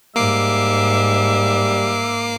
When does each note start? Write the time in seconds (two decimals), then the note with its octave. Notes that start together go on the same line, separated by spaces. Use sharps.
0.16 G#2 G3 A#3 E5 D6 C7